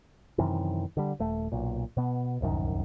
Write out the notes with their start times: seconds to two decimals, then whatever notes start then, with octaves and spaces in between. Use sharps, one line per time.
0.38 F#2 C3 D#3 E3
0.97 D3 G3
1.19 D#1 A3
1.52 B1 A#2
1.97 B2 B3
2.41 D1 C2 F#2 D#3